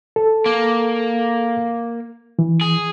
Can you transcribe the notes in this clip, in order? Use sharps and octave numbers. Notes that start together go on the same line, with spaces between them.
A4
A#3
E3
G#4